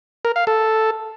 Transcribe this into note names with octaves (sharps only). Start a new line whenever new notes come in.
A#4
F5
A4